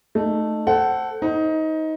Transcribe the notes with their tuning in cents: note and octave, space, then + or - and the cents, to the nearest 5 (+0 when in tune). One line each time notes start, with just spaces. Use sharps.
A3 +0 D#4 -20
A4 +0 C5 +0 F#5 +25
D#4 +20 C5 +0